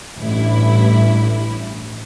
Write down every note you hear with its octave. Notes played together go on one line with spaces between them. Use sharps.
A1 G2 E4